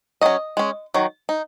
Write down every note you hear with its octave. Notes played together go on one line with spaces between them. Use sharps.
F#3 C#4 D#5
G#3 C#4
D#3 F#3
D#4